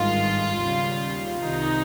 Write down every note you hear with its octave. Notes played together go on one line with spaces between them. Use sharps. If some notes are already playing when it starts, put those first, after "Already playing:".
Already playing: G#1 G2 D#3 G#3 F4
D#2 C#3 G3
C2 C3 D#3 G3 D#4